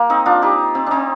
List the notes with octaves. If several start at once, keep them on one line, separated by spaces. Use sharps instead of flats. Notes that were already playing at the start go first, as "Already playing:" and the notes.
Already playing: A#3 G4
C4 D#4
D4 F4
D#4 G4
C4
C4 D4 D#4